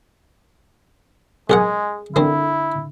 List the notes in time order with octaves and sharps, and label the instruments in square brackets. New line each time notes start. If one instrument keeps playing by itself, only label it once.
[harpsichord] B1 A#4 F#5 [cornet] G#3 [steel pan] G#4
[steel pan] D3 [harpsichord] A#3 C4 [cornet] E4